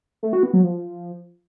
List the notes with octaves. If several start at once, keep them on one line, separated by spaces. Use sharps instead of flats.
A3
F#4
B3
F#3
F3